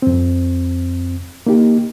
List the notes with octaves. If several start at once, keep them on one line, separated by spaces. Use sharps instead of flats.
F2 C4
A#3 D#4 G4